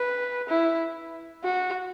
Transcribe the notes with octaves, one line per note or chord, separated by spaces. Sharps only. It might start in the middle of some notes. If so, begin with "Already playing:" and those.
Already playing: B4
E4
F#4